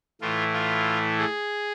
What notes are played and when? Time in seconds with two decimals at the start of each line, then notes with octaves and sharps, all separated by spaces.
0.22 A2 E3 A3 F4
0.54 F4
1.19 G#4